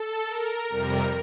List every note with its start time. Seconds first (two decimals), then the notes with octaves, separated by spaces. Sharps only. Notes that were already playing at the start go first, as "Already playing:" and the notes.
Already playing: A4
0.26 A#4
0.69 F2 C3 G3 A#4